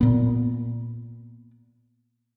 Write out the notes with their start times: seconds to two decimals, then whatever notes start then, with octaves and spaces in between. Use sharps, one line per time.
0.01 A#2 B3